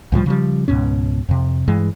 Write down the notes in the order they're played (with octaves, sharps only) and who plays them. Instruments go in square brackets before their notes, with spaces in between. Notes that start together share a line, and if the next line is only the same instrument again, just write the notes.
[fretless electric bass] C#2 A2 F3 G3
C#3 F3 G3
C#2 G#2 B2 C#4
F2 C3
G2 E3 G#3